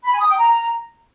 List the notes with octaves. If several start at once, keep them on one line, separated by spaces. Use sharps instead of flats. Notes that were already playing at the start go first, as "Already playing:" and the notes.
B5
G#5
D#6
G5
A#5